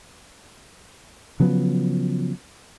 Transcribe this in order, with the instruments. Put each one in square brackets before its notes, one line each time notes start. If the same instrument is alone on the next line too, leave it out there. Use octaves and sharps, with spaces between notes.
[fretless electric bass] C#3 F3 F#3 B3